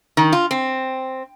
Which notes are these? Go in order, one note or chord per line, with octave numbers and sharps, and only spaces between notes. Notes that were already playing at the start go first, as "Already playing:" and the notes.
D#3
F4
C4